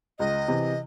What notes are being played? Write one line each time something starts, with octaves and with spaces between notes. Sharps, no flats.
C#2 D#5
C3 E3